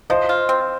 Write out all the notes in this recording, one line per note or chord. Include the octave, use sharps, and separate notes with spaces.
F3 C5 D#5
F4
C4